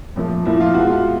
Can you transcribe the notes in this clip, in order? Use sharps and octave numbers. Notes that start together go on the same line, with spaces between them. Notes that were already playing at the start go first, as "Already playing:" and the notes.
A#2 F3 A3
A#2 F3 A3 E4
F4
B2 G#3 F#4
F4